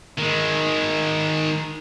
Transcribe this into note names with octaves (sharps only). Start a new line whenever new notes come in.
D#3 G#3